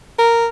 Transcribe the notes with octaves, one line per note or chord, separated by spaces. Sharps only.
A#4